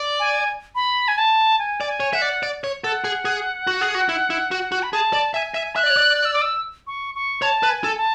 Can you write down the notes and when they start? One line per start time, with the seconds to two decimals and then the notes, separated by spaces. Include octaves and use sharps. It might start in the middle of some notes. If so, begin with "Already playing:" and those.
Already playing: D5
0.20 G#5
0.75 B5
1.08 G#5
1.18 A5
1.59 G#5
1.81 D5
1.87 G#5
2.00 C#5
2.13 E5 F#5
2.22 D5
2.43 D5
2.64 C#5
2.84 A4 F#5
3.04 G#4
3.25 G#4
3.67 F#4
3.81 G#4
3.95 F#4
4.09 E4
4.30 E4
4.51 F#4
4.72 F#4
4.83 B5
4.93 G#4 A5
5.13 D5
5.34 E5 G#5
5.54 E5
5.76 E5 F#6
5.83 D5
5.90 C#5
5.97 D5
6.18 F#6
6.25 E6
6.34 D6
6.42 E6
6.87 C#6
7.15 C#6
7.42 C#5 A5
7.63 B4
7.70 G#5
7.84 A4
7.98 A5